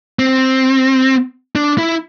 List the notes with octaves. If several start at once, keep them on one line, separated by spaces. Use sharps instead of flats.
C4
D4
E4